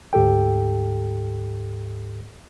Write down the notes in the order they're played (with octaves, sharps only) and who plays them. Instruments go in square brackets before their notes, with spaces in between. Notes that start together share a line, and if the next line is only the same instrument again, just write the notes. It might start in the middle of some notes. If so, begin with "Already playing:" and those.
[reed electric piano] D2 G#2 G4 A4 G5